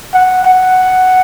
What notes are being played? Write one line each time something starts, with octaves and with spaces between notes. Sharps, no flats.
F#5
F#5